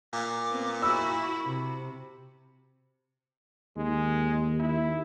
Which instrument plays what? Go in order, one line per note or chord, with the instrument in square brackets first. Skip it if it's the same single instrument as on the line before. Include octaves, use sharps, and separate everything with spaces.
[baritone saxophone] A#2 [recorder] D6
[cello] B3 C4
[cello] E4 F#4 [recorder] B5 [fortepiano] E6
[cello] C3
[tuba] D#2 [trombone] G#3
[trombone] E4